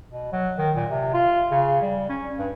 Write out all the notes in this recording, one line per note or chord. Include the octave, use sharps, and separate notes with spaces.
B2
F#3
D#3
A#2
C3
F4
C#3
G3
C#4
G2